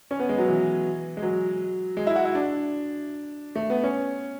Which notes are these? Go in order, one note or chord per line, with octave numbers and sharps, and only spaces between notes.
C#4
B3
G#3
F#3
E3
G#3
F#3
G#3
E4
F#4
E4
D4
A3
B3
C#4